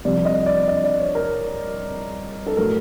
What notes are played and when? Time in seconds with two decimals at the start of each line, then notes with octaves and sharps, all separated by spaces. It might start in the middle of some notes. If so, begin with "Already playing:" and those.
0.05 C2 C3 F3 D5
0.25 D#5
0.46 D5
0.68 D#5
0.84 D5
0.99 C#5
1.15 A#4
2.47 A4
2.57 A2 F#3 A3 A#4